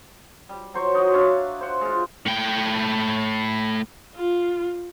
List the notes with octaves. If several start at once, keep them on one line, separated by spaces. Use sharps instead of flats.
G3
F#3 C5 C#6
D#4 F#4 D#5
D4 C#5 E5 F5
C5 F#5
G#3 F4
A2 G5
F4